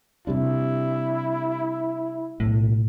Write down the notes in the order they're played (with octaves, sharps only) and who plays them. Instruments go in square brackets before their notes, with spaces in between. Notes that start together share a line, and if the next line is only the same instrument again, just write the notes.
[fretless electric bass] C3 G3 D4 [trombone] E4
[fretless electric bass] B1 [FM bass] A2